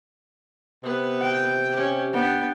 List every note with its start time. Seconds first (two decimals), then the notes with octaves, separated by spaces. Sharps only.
0.83 C3 B3 B4
1.22 G5
1.73 C#4 G4
2.14 B3 D4 G5